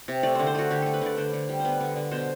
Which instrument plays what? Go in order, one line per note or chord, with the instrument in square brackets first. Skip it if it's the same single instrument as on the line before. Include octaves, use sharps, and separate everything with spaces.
[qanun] C3
A3 D5
D3 C5
C5
A3 F#4
D3 G4
A3 A4
B4
D3 D5
D3 C5
D3
G3
B3 B4 C5
D3
D3
B2 C5